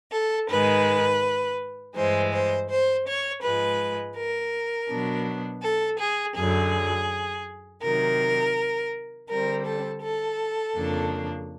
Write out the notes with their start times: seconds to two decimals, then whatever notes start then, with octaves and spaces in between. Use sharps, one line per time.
0.12 A4
0.50 G#2 D#3 G#3 B4
1.96 G2 E3 G#3 C5
2.32 C5
2.69 C5
3.06 C#5
3.42 G#2 F3 G#3 B4
4.17 A#4
4.89 B2 F#3 B3 D4
5.62 A4
6.00 G#4
6.36 F#2 D3 F#3 G#4
7.82 C3 D#3 F#3 A#4
9.29 D3 G3 C4 A#4
9.66 A4
10.02 A4
10.75 F2 C#3 F3 A#3 D4